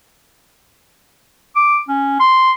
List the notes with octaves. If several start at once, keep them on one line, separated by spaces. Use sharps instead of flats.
D6
C#4
C6